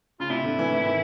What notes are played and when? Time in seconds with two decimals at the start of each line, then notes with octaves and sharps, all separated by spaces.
0.20 C#3 F4
0.30 C3 E4
0.44 D3
0.59 E3
0.72 E3
0.86 D#3